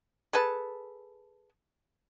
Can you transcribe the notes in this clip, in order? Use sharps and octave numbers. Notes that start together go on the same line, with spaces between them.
G#4 A4 B4 A5